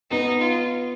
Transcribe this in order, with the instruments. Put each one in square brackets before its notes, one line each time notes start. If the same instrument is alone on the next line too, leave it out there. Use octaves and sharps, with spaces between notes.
[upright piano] B3 [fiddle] D#4
[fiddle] F4